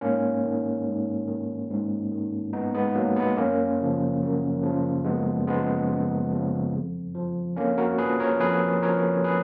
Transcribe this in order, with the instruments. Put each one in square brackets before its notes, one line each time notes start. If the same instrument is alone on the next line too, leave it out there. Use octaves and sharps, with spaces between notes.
[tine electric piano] G#2 A#3 C#4
D#3
G#2
D#3
G#2
D#3
G#2 B3 D#4
G#3 B3
D#3 F#3 A#3
G#3 B3
F#2 A#3 C#4
C#3 F3
F#2
C#3 F3
F#2 G#3 B3
C#3 F3 G#3 B3
F#2
C#3 F3
F2
F3
F2 A#3 C#4
F#4 A#4
F3 G#4 B4
A#4 C#5
F2 G#4 B4
F3 A#4 C#5
G#4 B4